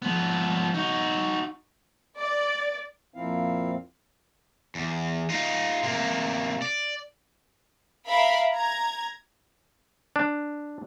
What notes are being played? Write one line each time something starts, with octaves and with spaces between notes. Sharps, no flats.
F3 B3
D#4 F#4
D5
F2 A#2 F3 C4 E4 F5
E2
D#4 F4
C3 A#3
D5
A#4 E5 F5 B5
A#5 G#6
D4